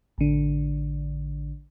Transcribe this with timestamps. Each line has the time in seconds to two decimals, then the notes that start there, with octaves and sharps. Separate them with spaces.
0.18 A1 D3